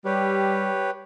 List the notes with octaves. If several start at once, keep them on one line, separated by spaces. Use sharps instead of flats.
G3 G4 B4 C#5